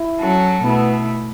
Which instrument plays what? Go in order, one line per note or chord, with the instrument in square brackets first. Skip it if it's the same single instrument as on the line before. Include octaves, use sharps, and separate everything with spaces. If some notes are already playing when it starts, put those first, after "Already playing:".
Already playing: [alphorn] E4
[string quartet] F#3 C#4 F#4 A4
[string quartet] B2 A3 E4 [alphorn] B3